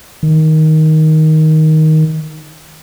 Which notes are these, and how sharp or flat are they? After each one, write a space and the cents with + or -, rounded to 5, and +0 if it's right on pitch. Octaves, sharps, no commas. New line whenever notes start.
D#3 +10